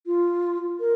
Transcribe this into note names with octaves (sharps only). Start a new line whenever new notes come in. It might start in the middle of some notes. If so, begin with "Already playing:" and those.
F4
A#4